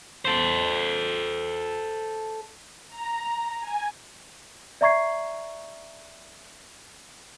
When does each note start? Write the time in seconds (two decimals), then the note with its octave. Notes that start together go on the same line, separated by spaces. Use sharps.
0.25 A4 C5
2.88 A#5
3.59 G#5
4.81 D5 E5 A#5 C#6 G#6 C7